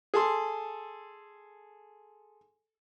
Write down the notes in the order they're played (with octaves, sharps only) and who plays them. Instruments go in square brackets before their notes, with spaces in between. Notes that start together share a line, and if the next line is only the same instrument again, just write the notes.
[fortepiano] G#4 A4 C6